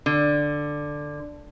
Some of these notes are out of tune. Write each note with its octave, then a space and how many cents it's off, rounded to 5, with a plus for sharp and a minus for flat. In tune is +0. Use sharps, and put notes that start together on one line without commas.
D3 +5